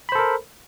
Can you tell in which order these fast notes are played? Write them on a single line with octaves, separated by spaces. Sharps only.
B5 C5 A4 A#4